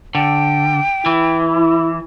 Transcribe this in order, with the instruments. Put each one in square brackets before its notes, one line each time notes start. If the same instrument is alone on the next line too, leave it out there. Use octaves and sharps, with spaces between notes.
[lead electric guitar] D3 [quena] G5
[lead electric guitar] E3 [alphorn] E4